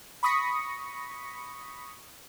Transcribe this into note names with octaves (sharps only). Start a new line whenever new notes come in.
B5 C#6 D#6 A#6 B6 C#7